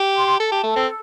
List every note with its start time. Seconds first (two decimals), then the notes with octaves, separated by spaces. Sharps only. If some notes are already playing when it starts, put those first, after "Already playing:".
Already playing: G4
0.16 C6
0.39 A4 A5
0.52 G4
0.63 A3 A4
0.76 C4